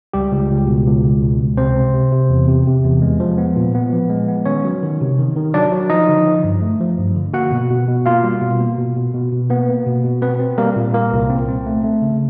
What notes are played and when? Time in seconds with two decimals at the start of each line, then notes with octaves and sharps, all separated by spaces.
0.14 C#2 G3 G4
0.32 C#2
0.51 C#2
0.68 B2
0.86 C#2
1.04 C#2
1.22 B2
1.41 C#2
1.58 C3 C4 C5
1.76 C3
1.94 C3
2.12 C3
2.30 E2
2.48 C3
2.67 C3
2.85 E2
3.02 G#3
3.20 F3
3.38 B3
3.56 A#2
3.75 B3
3.93 F3
4.10 G#3
4.28 B3
4.46 D#3 C#4 C#5
4.65 F#3
4.83 D#3
5.01 C3
5.19 D#3
5.36 D#3
5.54 F#3 D4 D5
5.72 F#3
5.90 F3 D#4 D#5
6.08 D3
6.26 F3
6.44 G2
6.62 A3
6.80 F3
6.99 G2
7.16 D3
7.34 A#3 F#4 F#5
7.52 B2
7.70 B2
7.88 B2
8.06 A#3 F4 F5
8.24 G3
8.42 B2
8.60 A#3
8.78 B2
8.97 B2
9.14 B2
9.32 B2
9.50 A#3 B3 B4
9.69 A#3
9.87 B2
10.04 B2
10.22 B3 C4 B4
10.40 C4
10.58 G3 A#3 A#4
10.76 A#2
10.94 A#2 A#3 A#4
11.13 C2
11.30 C4
11.48 C4
11.66 A3
11.84 A3
12.02 C#3